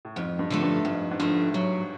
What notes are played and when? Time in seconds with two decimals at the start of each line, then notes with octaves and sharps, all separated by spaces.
0.05 A2
0.16 F2 G#2
0.39 G2
0.50 D3 F3 A3
0.62 G2
0.85 F2 G#2
1.11 G#2
1.19 G2 D3 F3 A3
1.54 F#3